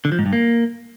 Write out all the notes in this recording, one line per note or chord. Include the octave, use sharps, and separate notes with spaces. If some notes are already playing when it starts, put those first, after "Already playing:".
D3
F3
G#2
G2
A#3